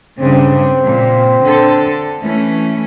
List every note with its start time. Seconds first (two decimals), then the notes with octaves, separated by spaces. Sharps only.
0.20 G2 C#3 C4 D4
0.82 A#2
1.43 D3 A4
2.22 E3 A3 C#4